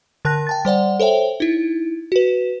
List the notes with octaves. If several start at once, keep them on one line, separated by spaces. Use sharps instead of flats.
D3 A#4 A5 F#6 A#6
G5 A5 A6
G3 C5 D5 F#5
A4 C5 C#5 E5 G5
D#4 E4
F#4 B4